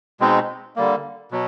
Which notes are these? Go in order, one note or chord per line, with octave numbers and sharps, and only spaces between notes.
B2 G#3 C4 D#4
D3 G3 A#3
B2 F#3